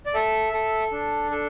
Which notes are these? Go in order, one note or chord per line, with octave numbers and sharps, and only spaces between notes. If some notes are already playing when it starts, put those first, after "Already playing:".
D5
A4 E5
A4
D4
A4